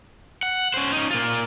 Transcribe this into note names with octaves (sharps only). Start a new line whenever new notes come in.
F#5
C#4 C5
C#4 D#4
A#3 F4